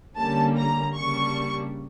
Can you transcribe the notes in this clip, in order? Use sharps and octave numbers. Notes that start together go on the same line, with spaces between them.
D3 G3 A#3 C#4 A5
A#5
C#3 G3 A#3 D4 C#6